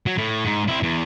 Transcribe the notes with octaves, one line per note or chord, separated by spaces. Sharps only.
F#3
A2
G#2
C4 E4
E2